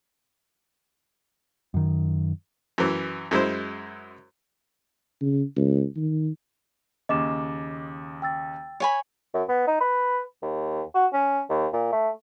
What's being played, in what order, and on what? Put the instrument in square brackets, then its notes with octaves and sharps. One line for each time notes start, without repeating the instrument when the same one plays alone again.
[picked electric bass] F#2 D#3
[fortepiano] F#2 E3
F#2 G#3 E4 C5
[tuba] C#3
C#2
D#3
[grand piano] D#2 C#3 [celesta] D#5 D6 E7
[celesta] G5 E6 A6
[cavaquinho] C#5 G#5 B5
[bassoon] F#2
B3
D#4
B4
D#2
F#4
C#4
D#2
A#2
A3